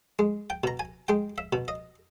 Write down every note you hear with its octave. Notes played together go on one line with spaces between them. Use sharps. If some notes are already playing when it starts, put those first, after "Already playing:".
G#3
G5
B2 A#5
G#5
G#3 G5
E5
B2
D#5